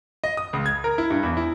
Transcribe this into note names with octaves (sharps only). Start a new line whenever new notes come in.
D#5
D#6
C#2
G#6
A#4
E4
G2
E2
E4